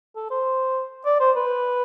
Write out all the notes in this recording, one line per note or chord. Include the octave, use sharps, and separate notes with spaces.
A4
C5
D5
C5
B4